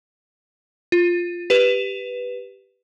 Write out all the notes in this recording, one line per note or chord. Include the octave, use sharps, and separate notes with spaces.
F4
G4 B4 E7